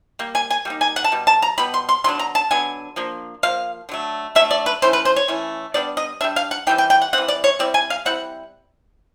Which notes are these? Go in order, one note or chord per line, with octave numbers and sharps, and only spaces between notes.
G3 A#3
G#5
G#5
G3 A#3 D#4
G#5
F#5
A5
B2 G3
A5
A#5
B2 G3 B3 B5
C6
C6
D3 F#3 B3 D4 C6
A#5
A5
D3 F#3 B3 D4 G#5
F3 A#3 D4
F3 A#3 F5
D3 F#3 A3
D3 F#3 A3 E5
D5
B4
E3 A3 C#4 E4 C5
B4
C5
C#5
E3 A3 C#4 E4
G3 B3 D4 D5
D#5
G3 B3 D4 E5
F5
F#5
E3 G3 C4 G5
G5
G5
F#5
E3 G3 C4 F#5
D5
C#5
G3 C4 E4 D5
G#5
F5
G3 C4 E4 F#5